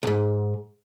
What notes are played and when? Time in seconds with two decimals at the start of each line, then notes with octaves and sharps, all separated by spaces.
0.03 B1 G#2